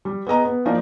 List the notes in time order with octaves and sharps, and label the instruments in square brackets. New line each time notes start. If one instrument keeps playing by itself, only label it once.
[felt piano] G3
B3 G#4 D#5 A#5
B3
F3 A#3 D#4 F4 D5